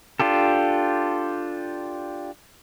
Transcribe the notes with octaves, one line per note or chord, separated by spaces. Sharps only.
D4 F4 G4 A4